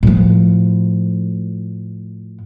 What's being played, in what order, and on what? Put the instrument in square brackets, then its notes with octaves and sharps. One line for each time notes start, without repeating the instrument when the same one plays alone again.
[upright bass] A2 F3